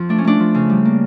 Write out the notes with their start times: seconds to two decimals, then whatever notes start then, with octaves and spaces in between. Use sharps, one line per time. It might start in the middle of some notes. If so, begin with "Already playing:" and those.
Already playing: F2 F3
0.09 A3 D4
0.18 C#4
0.25 A3 D4
0.40 F3
0.55 C#3
0.70 G3
0.85 A#3